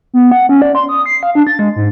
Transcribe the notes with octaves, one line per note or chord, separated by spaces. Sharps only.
B3
F#5
C#4
D5
C6
D#6
C7
F5
D4
A6
G#3
G#2